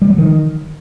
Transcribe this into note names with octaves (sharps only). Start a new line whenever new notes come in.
G3
F#3
D#3